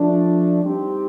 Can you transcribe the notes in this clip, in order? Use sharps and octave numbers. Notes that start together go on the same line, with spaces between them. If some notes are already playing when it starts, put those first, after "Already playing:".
Already playing: F3 A3 D4
G3 C4 D#4 G4